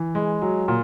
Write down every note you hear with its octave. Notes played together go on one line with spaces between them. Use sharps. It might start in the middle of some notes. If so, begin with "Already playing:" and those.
Already playing: E3
G#3
F#3
A#2